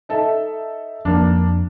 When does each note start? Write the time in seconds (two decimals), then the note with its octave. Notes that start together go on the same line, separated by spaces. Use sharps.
0.09 D#4 A4 E5
1.05 F2 A#3 D4